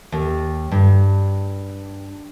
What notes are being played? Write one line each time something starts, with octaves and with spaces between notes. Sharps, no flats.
D#2
G2